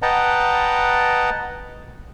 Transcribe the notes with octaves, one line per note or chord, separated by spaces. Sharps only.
B4 D#5 F#5 G5 A5 A#5